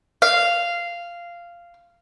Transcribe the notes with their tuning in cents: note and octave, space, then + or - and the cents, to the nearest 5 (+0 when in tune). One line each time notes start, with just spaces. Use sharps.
F5 -10